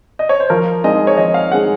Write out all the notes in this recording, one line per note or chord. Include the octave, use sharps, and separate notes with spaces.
D#5
C#5
C5
F3 A#4
G#3 C4 D#4 G#4 D#5
C#5
F3 D#5
F5
G#3 C4 D#4 G#4 F#5